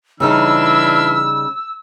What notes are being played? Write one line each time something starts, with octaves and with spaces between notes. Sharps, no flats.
C#3 E3 G3 D4 D#4 E6 F6